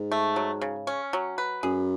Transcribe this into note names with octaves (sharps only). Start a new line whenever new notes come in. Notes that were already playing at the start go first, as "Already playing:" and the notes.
Already playing: G#2
A3
F#3
C#3
C#4
F#3
B4
F#2 G#4